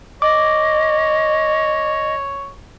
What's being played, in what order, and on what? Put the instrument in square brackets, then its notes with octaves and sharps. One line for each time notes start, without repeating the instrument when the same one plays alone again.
[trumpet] C#5 [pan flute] D#5 [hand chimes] D6